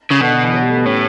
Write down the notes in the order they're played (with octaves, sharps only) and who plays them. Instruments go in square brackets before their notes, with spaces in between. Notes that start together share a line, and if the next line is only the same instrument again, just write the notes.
[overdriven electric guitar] C#3
[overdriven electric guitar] B2 [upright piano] D3
[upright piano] D3
E3
F#3
G3
A3
B3
[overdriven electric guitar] A2 [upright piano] C#4